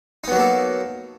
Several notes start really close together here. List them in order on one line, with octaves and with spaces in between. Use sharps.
D#4 B3 F#3 A#3 A4